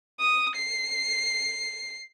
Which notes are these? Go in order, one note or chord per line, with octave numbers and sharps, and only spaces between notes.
D#6
C7